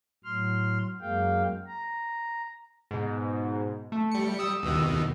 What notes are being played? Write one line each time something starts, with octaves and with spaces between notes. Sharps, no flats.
A2 F#3 C6 F6
F#2 F#3 G#3 A#3 F5 G5
A#5
G#2 B2
A3
G3 C#7
D#6 E6
D#2 B2 D#3